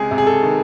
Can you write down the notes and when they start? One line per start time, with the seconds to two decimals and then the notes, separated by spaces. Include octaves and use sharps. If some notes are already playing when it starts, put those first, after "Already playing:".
Already playing: C#2 C3 G#3 G#4
0.11 C3
0.18 G#4
0.27 A4
0.42 D#3